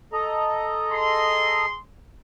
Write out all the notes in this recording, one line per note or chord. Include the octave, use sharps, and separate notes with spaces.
A4 D#5 A#5
G#4 C6